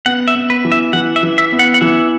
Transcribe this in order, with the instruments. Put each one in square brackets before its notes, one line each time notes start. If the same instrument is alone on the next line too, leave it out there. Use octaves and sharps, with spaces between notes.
[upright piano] B3 [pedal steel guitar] F#5
[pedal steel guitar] E5
[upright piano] B3
[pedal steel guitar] B4
[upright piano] E3
[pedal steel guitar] E5
[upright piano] E3 [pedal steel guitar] F#5
[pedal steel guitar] E5
[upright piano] E3
[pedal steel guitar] E5
[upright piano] B3
[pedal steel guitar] F#5
F#5
[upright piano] E3 [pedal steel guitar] E5